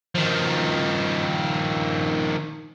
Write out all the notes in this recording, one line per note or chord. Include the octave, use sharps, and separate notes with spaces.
D#3 F3